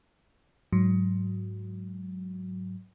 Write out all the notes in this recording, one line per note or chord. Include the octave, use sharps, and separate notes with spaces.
G#2 F#3